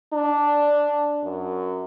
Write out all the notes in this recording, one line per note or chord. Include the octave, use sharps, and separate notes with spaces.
D4
F#2